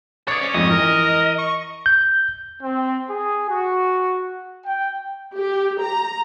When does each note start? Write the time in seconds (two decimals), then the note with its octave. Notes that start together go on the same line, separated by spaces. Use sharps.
0.28 G#4 C#5 D5 A6
0.41 C#4
0.54 F2 G#2 D#5
0.70 E3 A#4
1.38 C#6
1.86 G6
2.62 C4
3.08 G#4
3.49 F#4
4.65 G5
5.35 G4
5.81 A#5